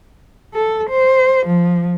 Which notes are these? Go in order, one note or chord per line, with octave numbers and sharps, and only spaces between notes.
A4
C5
F3